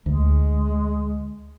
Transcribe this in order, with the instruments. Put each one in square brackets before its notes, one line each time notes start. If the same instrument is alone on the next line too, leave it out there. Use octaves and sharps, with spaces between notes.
[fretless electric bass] D2 [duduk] G#3